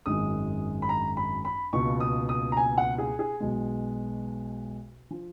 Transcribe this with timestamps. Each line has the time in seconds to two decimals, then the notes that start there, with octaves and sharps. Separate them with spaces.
0.06 G#1 F#2 D#3 G#3 D#6
0.82 B5
0.89 A#5
1.17 B5
1.45 B5
1.73 C#2 B2 A#3 C#6
2.00 D#6
2.29 D#6
2.52 A#5
2.57 G#5
2.78 F#5
2.98 G#4
3.19 G#4
3.40 B1 B2 G#3
5.11 F3